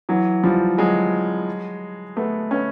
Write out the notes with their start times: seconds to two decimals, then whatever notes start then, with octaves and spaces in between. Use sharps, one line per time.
0.09 E3 F#3
0.43 F3 G3
0.78 F#3 G#3
2.16 A3 B3
2.51 B3 C#4